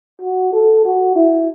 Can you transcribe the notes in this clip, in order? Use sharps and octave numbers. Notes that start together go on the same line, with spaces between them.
F#4
A4
F#4
E4